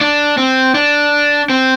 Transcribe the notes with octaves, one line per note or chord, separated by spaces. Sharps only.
D4
C4
D4
C4